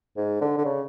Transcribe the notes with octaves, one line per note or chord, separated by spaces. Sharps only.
G#2
D3
D3
C#3